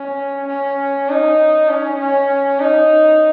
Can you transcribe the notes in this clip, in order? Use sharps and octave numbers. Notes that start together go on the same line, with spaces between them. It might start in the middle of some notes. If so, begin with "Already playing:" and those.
Already playing: C#4
C#4
D#4
C#4
C#4
D#4